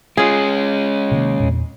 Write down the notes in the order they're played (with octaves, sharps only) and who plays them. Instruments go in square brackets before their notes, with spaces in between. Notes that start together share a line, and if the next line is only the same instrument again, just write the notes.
[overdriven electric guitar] G#3 C#4 [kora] F4 G#4
[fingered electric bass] C3 D#3 A#3
E2 A#2